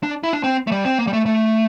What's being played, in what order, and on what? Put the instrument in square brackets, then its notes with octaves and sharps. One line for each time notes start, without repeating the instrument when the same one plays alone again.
[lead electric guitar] D4
E4
D4
C4
A3
G3
C4
A#3
G3
A3
A3